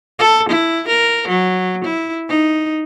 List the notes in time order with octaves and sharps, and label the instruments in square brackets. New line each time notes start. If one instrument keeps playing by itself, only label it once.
[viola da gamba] A4
E4
A#4
F#3
E4
D#4